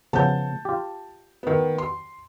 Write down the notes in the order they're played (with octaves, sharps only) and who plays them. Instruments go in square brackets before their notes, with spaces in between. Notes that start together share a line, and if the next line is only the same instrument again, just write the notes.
[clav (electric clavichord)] C#3 F3 B3 [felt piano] A5 G6
[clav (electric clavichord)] F4 G4
[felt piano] D#3 B3
C6